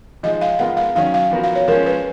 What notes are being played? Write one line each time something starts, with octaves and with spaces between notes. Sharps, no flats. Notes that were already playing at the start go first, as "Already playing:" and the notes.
F3 G#3 D#4 G#4 D#5
F5
G#3 B3 F4 A#4 F#5
F5
D#3 F#3 C#4 F5
F5
F3 B3 F#4 A#4
F5
C#5
F3 G#3 C#4 A#4
B4